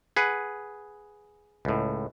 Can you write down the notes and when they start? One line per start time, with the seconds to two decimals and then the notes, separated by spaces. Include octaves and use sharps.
0.16 G#4 B4 F#5
1.65 C#2 A2